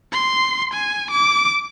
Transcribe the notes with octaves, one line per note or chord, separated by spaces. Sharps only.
C6
G#5
D6